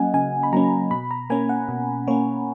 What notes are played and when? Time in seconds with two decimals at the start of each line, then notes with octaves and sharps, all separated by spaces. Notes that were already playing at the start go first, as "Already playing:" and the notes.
Already playing: F#3 A#3 C#4 D#5 F#5 G#5
0.14 C#3 G#5
0.43 B5
0.53 F#3 A#3 C#4 A#5
0.91 B2 B5
1.11 A#5
1.30 A#3 C#4 G#5
1.49 F#5
1.68 B2
2.07 A#3 C#4 C#5